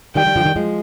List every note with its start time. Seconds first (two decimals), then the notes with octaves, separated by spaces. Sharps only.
0.15 D#3 G3 G5
0.26 D#3 G3
0.36 D3 F3
0.45 D#3 G3
0.56 F3 G#3